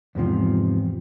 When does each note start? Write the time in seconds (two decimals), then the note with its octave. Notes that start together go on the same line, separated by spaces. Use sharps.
0.15 E2 G#2 C3 F3